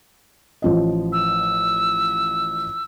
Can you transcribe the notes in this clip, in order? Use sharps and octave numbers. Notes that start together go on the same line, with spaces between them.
A1 F3 D#5
E6